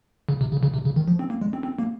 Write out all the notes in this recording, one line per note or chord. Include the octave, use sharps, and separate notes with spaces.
C#3
C3
C#3
C#3
C3
C#3
D#3
F3
C4
A#3
G#3
C4
C4
A#3